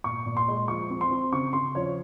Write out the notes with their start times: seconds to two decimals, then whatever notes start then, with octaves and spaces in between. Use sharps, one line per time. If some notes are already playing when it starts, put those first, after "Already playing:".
0.04 A#2 C#6
0.26 A#2
0.37 C6
0.48 G#3
0.68 F3 C#6
0.90 C4
1.01 C6
1.11 C4
1.33 C#3 C#6
1.53 C#3 C6
1.75 F3 C#5